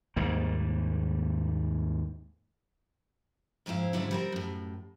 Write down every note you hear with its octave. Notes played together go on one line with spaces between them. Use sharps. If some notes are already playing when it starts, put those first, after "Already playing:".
D#2 G#2 G3 A#3
F2 G#2 C4 E4 F5
D2 G#2 C#3 F#3 D4 E4
G3 C4 A#4
F#2 A2